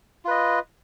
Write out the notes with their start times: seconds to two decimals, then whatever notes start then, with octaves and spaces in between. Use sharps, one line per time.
0.25 F4
0.28 B4
0.31 D#5